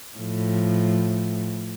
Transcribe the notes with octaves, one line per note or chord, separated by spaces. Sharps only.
A2 F3